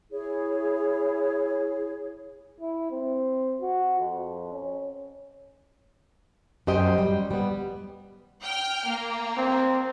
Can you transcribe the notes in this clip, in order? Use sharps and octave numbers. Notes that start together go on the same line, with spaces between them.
E4 G#4 C#5
E4
C4
F#4
F2
C#4
F#2 G4 C5 D#5 G5
G3
G3 B3
G5 F6
A#3
C4